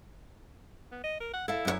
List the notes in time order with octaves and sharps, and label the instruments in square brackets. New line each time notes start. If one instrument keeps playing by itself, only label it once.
[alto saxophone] B3
D#5
A#4
F#5
[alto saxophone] E4 [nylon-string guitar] A4 F5
[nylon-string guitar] F#2 F#4 C#5